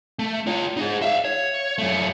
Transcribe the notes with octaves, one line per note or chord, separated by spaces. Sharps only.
A3
F4 C#5
D#4 G#4
E5 F5
C#5
F#2 A3